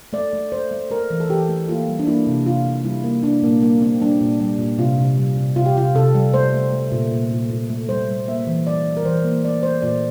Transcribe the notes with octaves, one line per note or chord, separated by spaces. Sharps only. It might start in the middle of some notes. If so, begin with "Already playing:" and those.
A3 D5
A3
A3 C5
A3
A3 A#4
E3
A4
E3 G4
A3
A#3 F4
G3
D4
A#3 E4
C3
C3 F4
C3
G3 E4
A#3
G3 D4
A#2 A#3
G3 A#3
A#3 C4
G3 D4
A#2
G3
A#2
C3 F4
C3
G3
C3
C3 F4
G4
C3 F4
C3 A4
G3
A3 C5
A3
A3
A#2
A#2
A#2
A#2
A3
G3 C5
G3
A#3 E5
E3
G3 D5
G3
A#4
E3 C5
A#3
A3 D5
A3 C5
A#2 D5